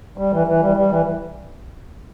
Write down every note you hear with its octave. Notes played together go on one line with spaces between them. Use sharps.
G3
E3
E3
G3
G3
E3